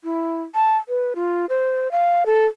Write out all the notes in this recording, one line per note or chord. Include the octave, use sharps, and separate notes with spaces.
E4
A5
B4
F4
C5
F5
A4